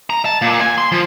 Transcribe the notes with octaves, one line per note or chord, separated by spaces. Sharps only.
A#5
A5
A#2
G#5
C6
F3